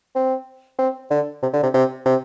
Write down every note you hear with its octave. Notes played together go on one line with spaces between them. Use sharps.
C4
C4
D3
C3
D3
C3
C3
C3